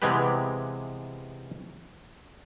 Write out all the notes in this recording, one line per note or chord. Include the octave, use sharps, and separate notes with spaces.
C3 E3 G#3 B3 G4 B4